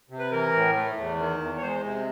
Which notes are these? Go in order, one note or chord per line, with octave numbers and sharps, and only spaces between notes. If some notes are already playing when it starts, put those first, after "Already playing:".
C3
B4
E3 A#4
A2
A3
E2
D#3
E2
C#5
G#3 C5
C3